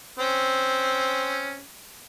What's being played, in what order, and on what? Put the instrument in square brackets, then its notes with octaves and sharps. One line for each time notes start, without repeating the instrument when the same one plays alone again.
[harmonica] C4 C#4